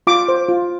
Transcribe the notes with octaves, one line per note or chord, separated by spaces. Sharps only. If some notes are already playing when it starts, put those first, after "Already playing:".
F4 D6
C5
F4